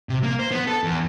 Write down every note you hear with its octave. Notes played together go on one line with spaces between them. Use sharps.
C3
A#3
C5
B3
A4
E2